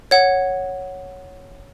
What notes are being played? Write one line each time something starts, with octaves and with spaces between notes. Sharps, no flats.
C#5 F#5